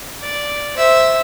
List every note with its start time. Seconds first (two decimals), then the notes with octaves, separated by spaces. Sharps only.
0.22 D5
0.77 C5 E5